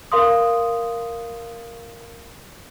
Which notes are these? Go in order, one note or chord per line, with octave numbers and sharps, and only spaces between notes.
A#4 F5 C6 D#6